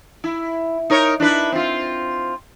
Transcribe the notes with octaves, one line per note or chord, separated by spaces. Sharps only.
E4
D#4 A#4 C#5
D4 E4 B4
C4 F4